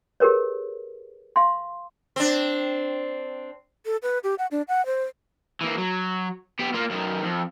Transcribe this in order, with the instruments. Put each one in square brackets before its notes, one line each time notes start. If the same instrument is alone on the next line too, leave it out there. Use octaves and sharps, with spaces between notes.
[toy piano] G4 G#4 A#4 B4 C#5
F5 C6
[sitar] C4 D4
[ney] A4
B4
G4
F#5
D4
F#5
C5
[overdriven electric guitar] E3 A#3
F#3
B3 G4
A#3 F4
F#2 D#3
F2